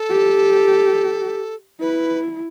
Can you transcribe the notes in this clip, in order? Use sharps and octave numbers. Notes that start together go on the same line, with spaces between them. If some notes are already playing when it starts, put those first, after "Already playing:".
Already playing: A4
G4
E4 B4